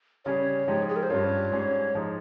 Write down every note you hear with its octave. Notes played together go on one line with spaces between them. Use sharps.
C#3 G3 C#4 G#4 C#5
G#2 F3 G#3 D#4 G4
G#4
A#4
C5
G2 G3 C#4 F4 C#5
G#2 G3 C#4 G#4
F3 G#3 D#4